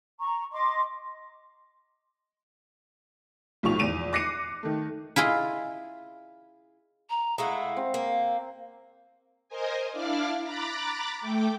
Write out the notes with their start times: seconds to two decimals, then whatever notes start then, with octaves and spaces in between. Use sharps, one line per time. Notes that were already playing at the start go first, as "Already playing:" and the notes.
0.19 A#5 C#6
0.52 D#5 C6 D6
3.63 B1 A2 F3 C#6 F7
3.79 E2 D#7 F7
4.13 D6 F#6 A#6 C7 C#7 D#7
4.63 D#3 A3
5.16 E4 F4 G#4 D#5
7.09 A#5
7.38 G#3 A3 E4 F5 F#5 A#5
7.77 C4
7.94 A#3
9.49 A#4 C5 D#5 G#5
9.92 D4 E4 D5 F5 D6 F6
10.42 A#5 B5 D6 F#6 A6
11.20 A3 G5 D6